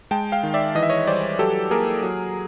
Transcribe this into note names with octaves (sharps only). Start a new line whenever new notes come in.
G#3 G5 A5
F5 G5
D#3
D5 E5
E3 D#5
E5
C#5 D#5
G3 C5 D5
F#3 G4 A4
A#3 G#4 A#4
F#3